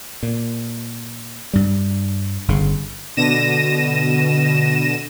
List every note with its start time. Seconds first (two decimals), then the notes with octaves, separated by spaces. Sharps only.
0.23 A#2
1.53 G2 G3
2.48 G1 C#3
3.17 B2 D3 A#6 D#7 E7